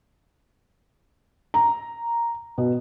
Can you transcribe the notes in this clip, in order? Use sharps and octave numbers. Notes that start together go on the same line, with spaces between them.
A#5
B2